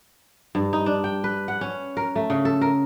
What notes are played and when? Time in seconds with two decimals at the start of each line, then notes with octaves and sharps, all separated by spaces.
0.55 G2
0.73 D#4
0.86 D4
1.04 G5
1.24 B4
1.48 F#5
1.61 C#4
1.97 A#4
2.16 A3
2.30 C#3
2.45 A4
2.61 A#4